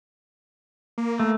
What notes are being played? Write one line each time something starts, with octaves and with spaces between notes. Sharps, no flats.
A#3
A3